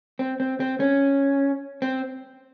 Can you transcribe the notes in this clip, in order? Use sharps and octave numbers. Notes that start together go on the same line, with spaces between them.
C4
C4
C4
C#4
C4